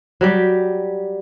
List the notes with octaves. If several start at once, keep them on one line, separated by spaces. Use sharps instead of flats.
F#3 G3 G4